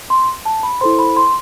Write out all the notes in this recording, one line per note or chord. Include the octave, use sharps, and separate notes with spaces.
C6
A5
B5
E4 A4 C5 C6
B5
C6